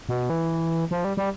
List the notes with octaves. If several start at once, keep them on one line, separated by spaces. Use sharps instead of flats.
B2
E3
F3
G3
G3